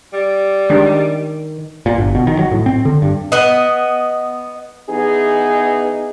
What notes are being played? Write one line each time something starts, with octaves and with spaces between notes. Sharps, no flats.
G3
D#3 G#3 D4 G4
A#2
G1
B2
D#3
F#3
A2
C4
D3
G2
B3 D#5
E3 B3 D#4 G#4